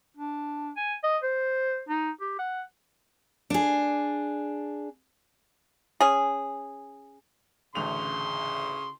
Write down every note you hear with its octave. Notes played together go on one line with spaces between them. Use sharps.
D4
G#5
D#5
C5
D#4
G4
F#5
D4 G#4
C#4 G#4
A1 D2 C#3 C6 F7